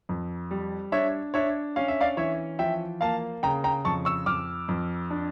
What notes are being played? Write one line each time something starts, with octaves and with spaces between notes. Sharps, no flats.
F2
G3
D4 C#5 E5
D4 C#5 E5
C#4 F5
E5
D5 F5
E3 C#5 E5
F3 E5 G5
A#3 F5 A5
C#3 G5 A#5
G5 A#5
F2 A5 C#6
C#6 E6
F2 D6 F6
F2
D4